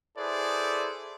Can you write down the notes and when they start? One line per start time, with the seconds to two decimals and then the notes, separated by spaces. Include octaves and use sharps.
0.18 E4 G#4 A4 B4 C5 D5